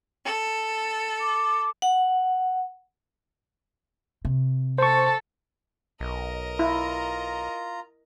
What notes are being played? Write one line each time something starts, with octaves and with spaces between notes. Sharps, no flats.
A4
D6
F#5
C3
A4 C5 C#6
B1 A#4 D#5
E4 F4 A#5